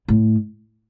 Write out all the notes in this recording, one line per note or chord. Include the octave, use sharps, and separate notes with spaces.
A2